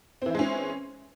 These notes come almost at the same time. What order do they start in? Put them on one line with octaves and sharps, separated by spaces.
C4 E3 E4 G#3 C#4